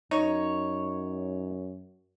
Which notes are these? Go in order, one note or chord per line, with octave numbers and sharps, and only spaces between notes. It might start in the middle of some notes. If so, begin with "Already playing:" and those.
F#2 D#4 C#5